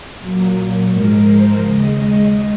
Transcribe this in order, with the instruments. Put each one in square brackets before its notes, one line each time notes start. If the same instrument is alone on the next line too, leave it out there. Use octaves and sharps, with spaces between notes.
[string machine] A#2 F#3 A#3
G#2 F3 G#3 A#4
C5
D#2 C#3 G#3 D#5